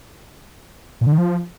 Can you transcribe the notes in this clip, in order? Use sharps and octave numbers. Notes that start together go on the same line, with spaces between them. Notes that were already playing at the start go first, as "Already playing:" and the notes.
A#2
D3
D#3
F3